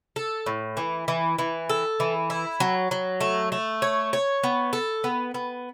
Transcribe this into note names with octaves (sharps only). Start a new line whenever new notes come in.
A4
A2
E3
E3
E3
A4
E3
E4
F#3
F#3
A3
A3
C#5
C#5
B3
A4
B3
B3